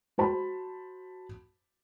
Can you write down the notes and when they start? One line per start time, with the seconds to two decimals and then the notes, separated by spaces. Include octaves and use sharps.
0.18 F#4 C5 A5 B5